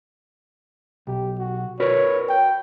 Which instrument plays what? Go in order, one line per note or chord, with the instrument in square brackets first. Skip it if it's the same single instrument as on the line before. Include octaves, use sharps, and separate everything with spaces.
[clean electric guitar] B1 [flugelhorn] G4
[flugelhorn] F#4
[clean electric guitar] F#4 A#4 B4 [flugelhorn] C#5
[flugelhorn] G5